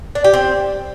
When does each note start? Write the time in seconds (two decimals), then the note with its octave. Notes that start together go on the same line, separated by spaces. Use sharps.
0.15 D4
0.24 G4
0.34 C4